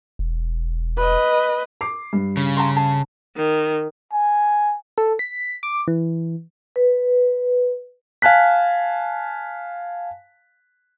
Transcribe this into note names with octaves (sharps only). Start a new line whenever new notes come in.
E1
B4 D#5
D6 C7
G2
C#3
A5 A#5 C6
A5
D#3
G#5
A4
B6
D6
E3
B4
F5 G#5 A5 F#6 B6